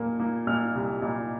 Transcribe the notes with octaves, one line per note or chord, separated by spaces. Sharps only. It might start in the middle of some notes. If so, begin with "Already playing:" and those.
Already playing: A#2 A#3
A#3
A#2 F6
C2
A#2